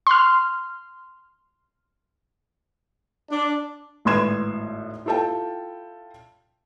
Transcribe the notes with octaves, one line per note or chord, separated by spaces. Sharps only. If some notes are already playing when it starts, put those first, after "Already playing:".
C6 F6
D4
G#1 A2 B3 C6 G#6 E7
E4 F4 A4 G5 A5